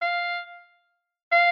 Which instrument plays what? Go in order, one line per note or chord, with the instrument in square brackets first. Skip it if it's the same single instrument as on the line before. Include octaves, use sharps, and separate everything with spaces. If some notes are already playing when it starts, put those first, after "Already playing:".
[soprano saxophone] F5
F5